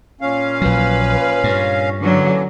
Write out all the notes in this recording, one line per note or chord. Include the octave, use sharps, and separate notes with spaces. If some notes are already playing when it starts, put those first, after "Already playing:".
A#2 C#4 F5
A#1 F#3 B4
G2
D3 E3 F#3 A#3 C#4